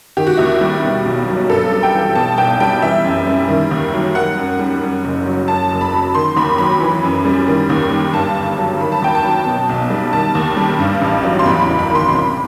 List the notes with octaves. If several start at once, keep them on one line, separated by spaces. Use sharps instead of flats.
D#3 G4
F#4
D#2 E4
F#4
G3
B2
B1
F#3
G2 A4
G3
G5
E3
B2 A5
B1 G5
G3 G5
E3 E5
F#2
G3
D#3
D#2
F#3
D#3 F#5
F#2
G3
F#2
F#1
F#3
F#2 A5
F#1
B5
F#3
D#3 C6
D#2 B5
F#3 B5
E3
F#2
G3
D#3
D#2
G3
G2 A5
G1
F#3
D#3 B5
A5
D#2 G5
A5
F#3
B2
B1
G3
D#3 A5
D#2
G3
G2
A1
F#3
C6
E2 B5
F#1
B5
D#3
C6
C6
C3 B5